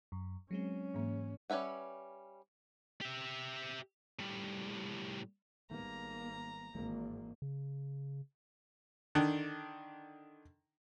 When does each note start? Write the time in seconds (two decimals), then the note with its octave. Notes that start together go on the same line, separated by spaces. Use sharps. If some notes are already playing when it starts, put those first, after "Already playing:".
0.12 F#2
0.51 F#3 G#3 C4 C#4
0.94 G#2 E3 A#3
1.50 G3 C#4 B4 E5 F#5
3.01 G4 E5
4.19 A2 G3
5.71 G#1 D#3 G3 A#3 B3 A#5
6.75 G#1 E3 G#3 A#3 C4
7.42 C#3
9.15 D3 D#3 D4